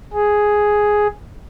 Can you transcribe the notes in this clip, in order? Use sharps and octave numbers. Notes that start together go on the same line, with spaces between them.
G#4